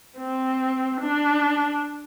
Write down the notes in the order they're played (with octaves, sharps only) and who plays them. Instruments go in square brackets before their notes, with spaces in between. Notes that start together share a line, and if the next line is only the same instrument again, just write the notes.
[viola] C4
D4